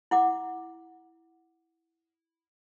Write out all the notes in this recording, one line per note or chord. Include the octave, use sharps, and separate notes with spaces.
E4 F#5 D6